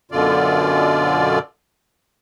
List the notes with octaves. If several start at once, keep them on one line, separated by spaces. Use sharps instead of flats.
F#2 B2 D3 F4 D5